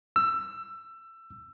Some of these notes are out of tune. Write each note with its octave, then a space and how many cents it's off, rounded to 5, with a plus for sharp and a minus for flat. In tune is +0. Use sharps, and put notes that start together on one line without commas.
E6 +20